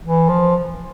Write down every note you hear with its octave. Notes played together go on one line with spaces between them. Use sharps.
E3
F3